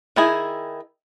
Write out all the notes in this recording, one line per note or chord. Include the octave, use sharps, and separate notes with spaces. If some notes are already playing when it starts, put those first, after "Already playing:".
D#3 E4 G#4